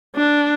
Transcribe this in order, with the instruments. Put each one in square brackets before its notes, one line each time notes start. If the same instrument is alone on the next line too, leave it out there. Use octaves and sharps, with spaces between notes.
[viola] D4